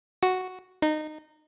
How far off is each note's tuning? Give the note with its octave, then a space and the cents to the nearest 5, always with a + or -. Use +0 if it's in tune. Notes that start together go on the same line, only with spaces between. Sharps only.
F#4 +0
D#4 -20